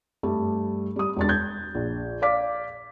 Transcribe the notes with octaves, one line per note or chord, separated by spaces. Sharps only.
G2 G3 A3
G3 D#6
E1 D4 A6
G6 G#6
A#1
D5 F5 D6 B6